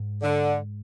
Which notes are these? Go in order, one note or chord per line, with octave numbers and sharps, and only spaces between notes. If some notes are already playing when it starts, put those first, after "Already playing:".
Already playing: G#2
D3